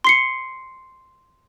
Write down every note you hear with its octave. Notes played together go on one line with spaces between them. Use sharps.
C6 C7 C#7